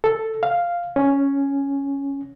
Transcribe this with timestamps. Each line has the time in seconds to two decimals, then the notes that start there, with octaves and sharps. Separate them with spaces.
0.04 A4
0.43 F5
0.96 C#4